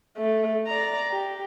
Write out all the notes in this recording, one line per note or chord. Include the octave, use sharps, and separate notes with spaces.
A3
D5 A#5
G4